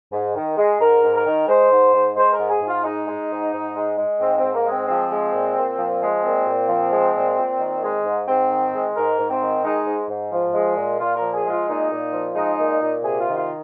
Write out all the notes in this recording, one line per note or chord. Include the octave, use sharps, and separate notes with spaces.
G#2
D#3
G#3
G#2 A#4
G#2
A#4
D#3
G#3 C5
G#2
G#2
G#3 C5
A#4
G#2
G#4
G#2
F4
G#3 D#4
G#3
G#2
G#2
G#3
G#3
G#2 C4
C4
G#2
A#3
G#3
C4
F3 C4
G#3
A#2
A#2
F3
G#3
A#2 C4
A#2
F3
G#3
A#2
A#2
D#3
G#3
G#2
G#2 C4
D#3
G#3
G#2 A#4
G#2
C4
D#3
G#3 D#4
G#2
G#2
F3
G#3
A#2
A#2 F4
A#4
F3
G#4
G#3 F4
A#2 D#4
A#2
F3
G#3 D#4
A#2
A#2
C3 G#4
F4
D#3
F4